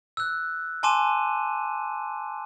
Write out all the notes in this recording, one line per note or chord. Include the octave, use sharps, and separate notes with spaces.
E6 F#6
G#5 A5 C6 D6 D#7 E7